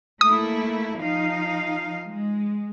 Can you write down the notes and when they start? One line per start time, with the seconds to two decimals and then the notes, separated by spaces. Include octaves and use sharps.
0.21 A3 A#3 E4 D#6
0.98 F3 D#4 F5
2.05 G#3